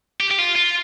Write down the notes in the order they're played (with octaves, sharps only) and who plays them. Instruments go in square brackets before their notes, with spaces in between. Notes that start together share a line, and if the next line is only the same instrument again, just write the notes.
[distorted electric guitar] G4
G4
F4
F4